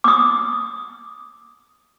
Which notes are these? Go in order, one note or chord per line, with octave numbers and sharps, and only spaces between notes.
D6 D#6